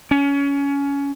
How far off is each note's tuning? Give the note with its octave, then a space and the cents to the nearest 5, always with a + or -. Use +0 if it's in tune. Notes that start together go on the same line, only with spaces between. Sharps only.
C#4 +20